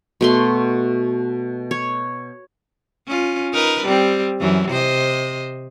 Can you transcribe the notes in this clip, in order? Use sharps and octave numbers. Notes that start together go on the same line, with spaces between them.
B2 A3 C6
C#5
C#4 F4
D#4 A#4 B4
G3 C4
F#2 E3 F#3
C3 C5 D#5